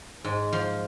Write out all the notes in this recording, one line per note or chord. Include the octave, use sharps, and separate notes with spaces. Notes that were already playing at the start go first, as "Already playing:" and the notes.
G#2
F3